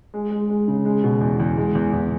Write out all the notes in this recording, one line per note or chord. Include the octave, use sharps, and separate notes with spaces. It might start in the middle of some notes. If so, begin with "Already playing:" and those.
G#3
G#3
G#3
C#3
G#3
B2
E2
E2
G#3
E2
E2